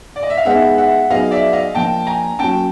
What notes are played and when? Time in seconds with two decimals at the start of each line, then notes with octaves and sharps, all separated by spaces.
0.16 D5
0.23 D#5
0.30 E5
0.38 F5
0.45 G#3 B3 D#4 G#4 E5 F#5
0.78 E5 F#5
1.10 F#3 B3 D#4 G#4 D#5 F5
1.31 D5 E5
1.53 D#5 F5
1.75 F3 A#3 D4 G5 A5
2.07 G#5 A#5
2.39 F#3 A#3 C#4 G5 A5